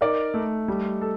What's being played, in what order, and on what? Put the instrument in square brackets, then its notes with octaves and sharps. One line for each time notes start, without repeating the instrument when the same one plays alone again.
[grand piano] D#4 [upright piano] A#4 D5
[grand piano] A3
G3
A4